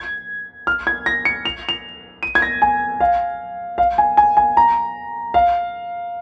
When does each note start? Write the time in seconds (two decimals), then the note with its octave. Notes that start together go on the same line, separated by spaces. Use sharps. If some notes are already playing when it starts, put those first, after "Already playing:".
Already playing: G#6
0.67 F6
0.87 G#6
1.06 A#6
1.25 C#7
1.45 F7
1.69 F7
2.23 D#7
2.35 G#6
2.42 A#6
2.62 G#5
3.00 F5
3.78 F5
3.98 G#5
4.17 G#5
4.37 G#5
4.57 A#5
5.34 F5